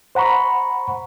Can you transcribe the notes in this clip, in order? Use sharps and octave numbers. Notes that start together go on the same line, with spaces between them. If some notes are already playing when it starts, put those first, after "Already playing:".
C5 F#5 A#5 B5 C#6